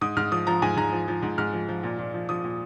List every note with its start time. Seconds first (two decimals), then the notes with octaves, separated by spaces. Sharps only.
0.01 G#2 D#6
0.17 G#2 F6
0.32 F3 D#6
0.47 F3 A#5
0.62 G#2 G#5
0.77 G#2 A#5
0.92 F3
1.08 F3
1.23 G#2
1.38 G#2 F6
1.53 F3
1.68 F3
1.83 A#2
1.99 A#2
2.14 F3
2.29 F3 D#6
2.44 A#2